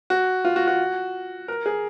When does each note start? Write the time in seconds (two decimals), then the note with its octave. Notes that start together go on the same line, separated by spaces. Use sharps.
0.10 F#4
0.45 F4
0.56 F#4
0.67 F#4
1.48 A#4
1.66 G#4